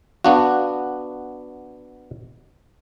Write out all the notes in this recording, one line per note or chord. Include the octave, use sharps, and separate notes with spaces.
B3 D4 F#4 F5